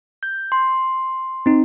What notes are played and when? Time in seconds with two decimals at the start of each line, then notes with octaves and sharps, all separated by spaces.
0.23 G6
0.52 C6
1.46 C4 D#4